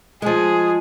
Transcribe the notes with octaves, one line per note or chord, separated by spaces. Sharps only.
F3 G#3 G#4